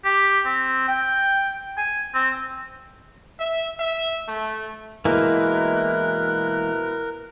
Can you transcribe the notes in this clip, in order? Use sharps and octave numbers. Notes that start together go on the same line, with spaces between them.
G4
C4
G5
G#5
C4
E5
E5
A3
B2 E3 G#3 A#3 E4 A#4 B4 F#6